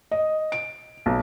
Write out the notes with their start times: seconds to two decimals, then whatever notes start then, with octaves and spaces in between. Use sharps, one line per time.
0.11 D#5
0.52 D7
1.06 B1